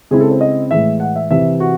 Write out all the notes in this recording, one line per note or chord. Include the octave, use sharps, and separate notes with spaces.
C#3 G#3 C4 E4 G#4
A4
C5
D#5
A2 E3 G#3 E5
F#5
E5
C3 E3 C4 E5
F#4